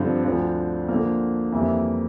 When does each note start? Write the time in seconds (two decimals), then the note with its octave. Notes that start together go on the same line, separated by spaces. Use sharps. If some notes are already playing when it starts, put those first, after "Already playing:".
Already playing: G2 D3 F3 C4
0.25 D2 D3 F3
0.88 D3 F3 A#3
1.52 F2 E3 G3 A#3 E4